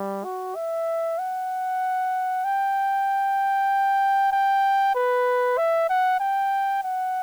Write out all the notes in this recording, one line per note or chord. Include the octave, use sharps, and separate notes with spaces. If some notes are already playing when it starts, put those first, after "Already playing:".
Already playing: G3
F#4
E5
F#5
G5
G5
B4
E5
F#5
G5
F#5